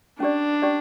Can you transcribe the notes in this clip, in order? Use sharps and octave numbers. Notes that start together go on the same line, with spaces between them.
C#4 D4 G4 D5
C#4 G4 D5